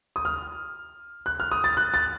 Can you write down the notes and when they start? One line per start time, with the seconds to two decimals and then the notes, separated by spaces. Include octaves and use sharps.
0.16 D#6
0.25 F6
1.26 F#6
1.40 F6
1.52 D#6
1.64 A6
1.77 F#6
1.94 A6